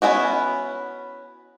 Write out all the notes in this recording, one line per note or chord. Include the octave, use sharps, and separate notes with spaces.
B3 C#4 E4 F#4